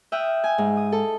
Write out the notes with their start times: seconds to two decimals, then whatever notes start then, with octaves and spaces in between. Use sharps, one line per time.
0.12 E5 G5 D#6 F6 F#6
0.44 G#5
0.58 G#2
0.77 D#6
0.92 A4